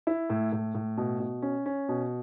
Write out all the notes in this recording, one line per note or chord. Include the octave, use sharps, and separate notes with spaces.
E4
A2
A2
A2
B2
B2
C#4
C#4
B2